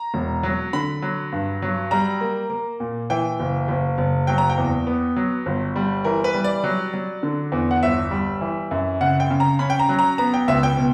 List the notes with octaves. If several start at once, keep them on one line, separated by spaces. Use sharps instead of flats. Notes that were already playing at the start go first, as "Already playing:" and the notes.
Already playing: A#5
E1
F#3
D3 B5
F#3
G2
F#3
G3 A#5
A#3
A#3
A#2
E3 G5
F#1
F#1
F#1
F#3 G5
A#5
G5
E2
B3
F#3
G1
G3
E3 A#4
B4
G3
D5
F#3
F#3
D3
E2
F#5
G1 E5
G3
E3
F#2
C#3 F#5
G5
C#3
A#5
C#4 B5
G5
A#5
F#3
A#5
B3 A#5
G5
C#2 E5
G5
B2